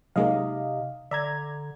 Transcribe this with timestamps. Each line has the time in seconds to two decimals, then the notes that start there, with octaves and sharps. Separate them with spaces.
0.16 C3 F#3 G#3 A#3 D#4 D#5 F5
1.11 D3 D5 E5 A#5 G#6